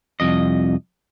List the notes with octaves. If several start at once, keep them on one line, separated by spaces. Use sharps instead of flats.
C2 F2 D#5